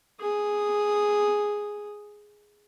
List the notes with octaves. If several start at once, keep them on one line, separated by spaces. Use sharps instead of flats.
G#4 D#6